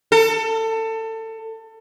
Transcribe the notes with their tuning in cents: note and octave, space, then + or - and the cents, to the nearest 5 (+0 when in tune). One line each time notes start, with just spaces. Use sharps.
A4 +25